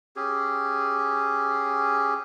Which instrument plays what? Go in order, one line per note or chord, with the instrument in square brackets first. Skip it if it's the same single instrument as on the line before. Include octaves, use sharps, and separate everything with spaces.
[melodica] C#4 G4 G#4